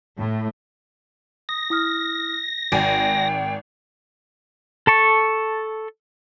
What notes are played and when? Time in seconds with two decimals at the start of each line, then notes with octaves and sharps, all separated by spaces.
0.18 A2
1.49 D#6 A#6
1.70 E4 D#6 F6
2.72 G#1 G5 G#5 D7
4.87 A4 A5 C#6